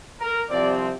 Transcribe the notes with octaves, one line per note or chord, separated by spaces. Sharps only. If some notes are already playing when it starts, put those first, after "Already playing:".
A#4
C2 C3 F3 C4 D5